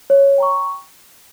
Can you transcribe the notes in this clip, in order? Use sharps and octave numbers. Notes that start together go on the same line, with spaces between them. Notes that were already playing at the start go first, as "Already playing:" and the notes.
C#5
G5 A#5 C#6